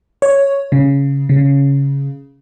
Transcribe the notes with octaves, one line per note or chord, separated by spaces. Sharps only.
C#5
C#3
C#3